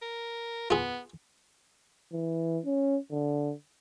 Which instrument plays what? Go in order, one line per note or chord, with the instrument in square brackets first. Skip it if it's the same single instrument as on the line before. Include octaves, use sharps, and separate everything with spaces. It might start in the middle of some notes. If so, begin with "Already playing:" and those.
[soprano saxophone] A#4
[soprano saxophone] B3 [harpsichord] F4 G#4
[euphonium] E3
C#4
D3